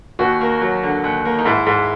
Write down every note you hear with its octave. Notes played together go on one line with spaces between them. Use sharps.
D#2 F#4
A#3
F#3
D3
D#2
A#3
D#4
G#2 E4
G#2